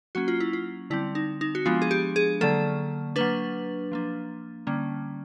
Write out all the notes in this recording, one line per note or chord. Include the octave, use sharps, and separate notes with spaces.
F#3 A#3 C#4 F#4
F4
E4
F4
D3 G3 C4 E4
D#4
D#4
F#4
F3 G#3 B3 D4 F4
G#4
G4
G#4
D3 F#3 A#3 A4
F#3 A#3 D4 B4
F3 A#3 D4
D3 G3 A#3 C#4